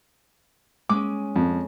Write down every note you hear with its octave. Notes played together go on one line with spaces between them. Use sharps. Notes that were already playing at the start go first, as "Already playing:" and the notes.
G#3 C#4 D6
F2